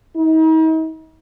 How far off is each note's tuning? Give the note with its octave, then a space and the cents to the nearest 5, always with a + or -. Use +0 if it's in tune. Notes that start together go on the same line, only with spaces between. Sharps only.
D#4 +40